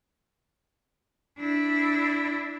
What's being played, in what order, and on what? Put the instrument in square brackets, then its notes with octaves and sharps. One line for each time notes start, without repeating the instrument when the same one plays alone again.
[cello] D4 E4